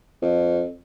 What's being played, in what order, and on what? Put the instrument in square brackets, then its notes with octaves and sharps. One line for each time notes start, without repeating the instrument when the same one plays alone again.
[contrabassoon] F2